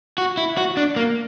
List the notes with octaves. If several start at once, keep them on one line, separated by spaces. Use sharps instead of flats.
F#4
E4
F#4
D4
A#3